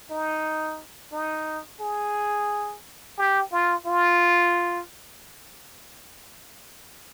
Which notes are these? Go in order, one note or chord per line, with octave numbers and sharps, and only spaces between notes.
D#4
D#4
G#4
G4
F4
F4